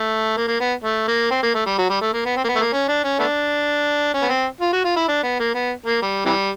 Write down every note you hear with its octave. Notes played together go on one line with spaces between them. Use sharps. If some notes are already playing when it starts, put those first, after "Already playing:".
Already playing: A3
A#3
A#3
B3
A3
A#3
C4
A#3
A3
G3
F#3
G3
A3
A#3
B3
C4
A#3
B3
A3
A#3
C#4
D4
C#4
A3 B3 D4
C#4
B3
C4
F4
F#4
F4
E4
D4
B3
A#3
B3
A#3
G3
C3 E3 G3